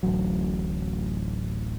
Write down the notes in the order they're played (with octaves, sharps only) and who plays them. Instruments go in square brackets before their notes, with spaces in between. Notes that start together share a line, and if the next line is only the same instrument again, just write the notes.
[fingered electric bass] D1 A1 F#3